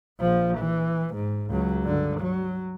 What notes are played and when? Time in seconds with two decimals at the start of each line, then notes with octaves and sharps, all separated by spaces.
0.20 A#1 F3
0.58 E3
1.15 G#2
1.49 C#2 F#3
1.83 G2 D3
2.20 F#3